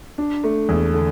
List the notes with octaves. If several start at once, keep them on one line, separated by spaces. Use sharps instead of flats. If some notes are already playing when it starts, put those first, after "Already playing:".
D4
A3
E2
D3